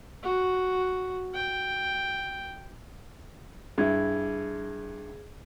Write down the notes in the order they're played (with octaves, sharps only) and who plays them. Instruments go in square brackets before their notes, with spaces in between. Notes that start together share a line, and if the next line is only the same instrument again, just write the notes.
[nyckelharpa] F#4
G5
[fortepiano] G2 E4 [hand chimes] G#4 G#6